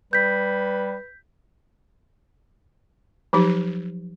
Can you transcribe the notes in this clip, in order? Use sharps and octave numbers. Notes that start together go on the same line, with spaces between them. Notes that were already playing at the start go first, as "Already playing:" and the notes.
G3 B4 G6 B6
F3 F#3 D#4 G4